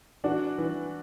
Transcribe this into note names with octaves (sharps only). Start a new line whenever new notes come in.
E3 D4 F#4
E3